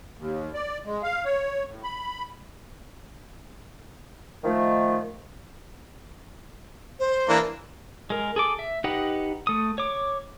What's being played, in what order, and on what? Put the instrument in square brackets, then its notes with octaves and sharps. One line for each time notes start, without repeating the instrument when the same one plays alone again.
[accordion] D#2
D5
G#3
F5
C#5
A2
B5
[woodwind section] D#3 F3 A3
[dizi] C5
[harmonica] E3 A#3 D4
[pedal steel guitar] G#3 A#4
G#4 A4 D6
E5
D#4 G4 B4 D#5 F#5
A3 D#6
C#5 D6